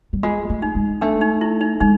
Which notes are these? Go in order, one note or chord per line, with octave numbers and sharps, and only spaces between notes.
G3
G#3 F4
A3
D#4
G#3
A3 D4
D#4
E4
D#4
G#3 D#4